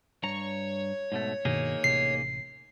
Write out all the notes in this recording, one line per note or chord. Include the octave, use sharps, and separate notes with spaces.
G2 C#5 A#5
G#2 B2 A3
G2 B2 D#3 A#3 D#4 G#4
A1 C3 C7